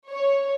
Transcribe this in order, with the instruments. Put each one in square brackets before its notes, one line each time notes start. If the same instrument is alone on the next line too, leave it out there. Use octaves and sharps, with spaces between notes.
[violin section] C#5